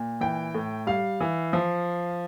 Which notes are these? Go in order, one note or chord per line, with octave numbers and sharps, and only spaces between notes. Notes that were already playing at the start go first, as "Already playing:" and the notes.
Already playing: A#2
E3 G5
A2
G3 F5
E3
F3